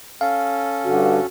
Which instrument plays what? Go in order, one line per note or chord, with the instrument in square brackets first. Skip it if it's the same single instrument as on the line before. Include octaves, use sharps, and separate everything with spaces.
[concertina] C#4 A4 [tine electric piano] F5
[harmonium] G2 D3 [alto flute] F#4